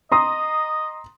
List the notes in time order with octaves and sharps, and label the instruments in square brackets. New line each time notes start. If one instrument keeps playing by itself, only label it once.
[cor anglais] D#5 [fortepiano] A#5 C6 D#6